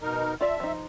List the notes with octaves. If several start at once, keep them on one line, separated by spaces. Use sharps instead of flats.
B2 D#4 A#4
F4 D5 E5 A5
F3 D#4